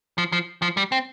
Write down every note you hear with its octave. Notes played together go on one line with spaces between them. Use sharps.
F3
F3
F3
G3
C4